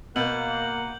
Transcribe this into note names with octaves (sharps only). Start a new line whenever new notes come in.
B2 A#3 F#5 G6 F#7